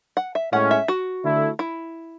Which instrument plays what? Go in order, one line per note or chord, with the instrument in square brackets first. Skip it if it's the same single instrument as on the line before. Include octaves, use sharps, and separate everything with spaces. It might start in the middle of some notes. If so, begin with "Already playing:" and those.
[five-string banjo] F#5
E5
[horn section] A2 G#3 C#4 [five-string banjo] F#5
[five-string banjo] E5
F#4
[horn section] D3 A3 E4
[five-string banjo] E4